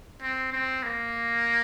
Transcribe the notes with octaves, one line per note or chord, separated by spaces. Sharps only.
C4
C4
A#3